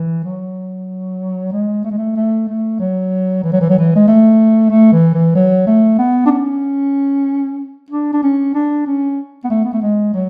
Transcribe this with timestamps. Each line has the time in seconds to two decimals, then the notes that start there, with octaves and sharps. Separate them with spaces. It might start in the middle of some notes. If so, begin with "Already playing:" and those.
Already playing: E3
0.24 F#3
1.52 G#3
1.84 A3
1.91 G#3
1.98 A3
2.16 A3
2.48 A3
2.80 F#3
3.44 E3
3.53 F#3
3.61 E3
3.70 F#3
3.79 E3
3.95 G#3
4.08 A3
4.71 A3
4.93 E3
5.14 E3
5.35 F#3
5.67 A3
5.99 B3
6.26 D4
6.31 C#4
7.90 D4
8.13 D4
8.23 C#4
8.55 D4
8.87 C#4
9.44 B3
9.50 A3
9.64 B3
9.73 A3
9.82 G#3
10.14 F#3